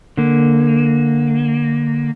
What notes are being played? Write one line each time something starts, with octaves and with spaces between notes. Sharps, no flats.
D3 A#3